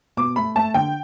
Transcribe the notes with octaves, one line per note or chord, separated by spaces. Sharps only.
B2 D6
A3 B5
A3 A5
D3 G5